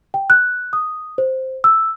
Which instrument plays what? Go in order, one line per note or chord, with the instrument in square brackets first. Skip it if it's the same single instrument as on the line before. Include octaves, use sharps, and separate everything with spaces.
[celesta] G5
F#6
D#6
C5
E6